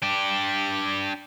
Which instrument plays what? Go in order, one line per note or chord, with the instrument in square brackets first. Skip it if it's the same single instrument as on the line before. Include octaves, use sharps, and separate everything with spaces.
[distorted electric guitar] D4 G4